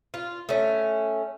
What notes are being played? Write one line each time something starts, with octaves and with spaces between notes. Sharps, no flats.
F4
A3 C#4